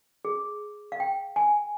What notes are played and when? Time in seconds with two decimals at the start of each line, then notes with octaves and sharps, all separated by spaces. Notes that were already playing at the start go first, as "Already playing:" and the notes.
0.25 G#4
0.92 F5
1.00 G5
1.36 G#5